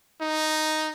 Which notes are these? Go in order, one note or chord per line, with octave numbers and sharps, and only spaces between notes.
D#4